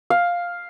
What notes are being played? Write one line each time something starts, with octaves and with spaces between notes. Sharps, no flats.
F5